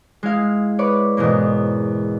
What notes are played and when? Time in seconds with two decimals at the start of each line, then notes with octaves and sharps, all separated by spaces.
0.23 G#3 E4 F5
0.79 B4 C#5 D5
1.17 E2 G#2 B2 A#3